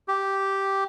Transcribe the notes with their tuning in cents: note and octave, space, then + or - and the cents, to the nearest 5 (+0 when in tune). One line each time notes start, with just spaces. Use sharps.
G4 -5